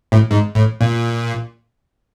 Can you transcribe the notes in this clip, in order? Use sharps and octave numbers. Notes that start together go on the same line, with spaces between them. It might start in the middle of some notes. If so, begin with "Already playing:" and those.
A2
G#2
A2
A#2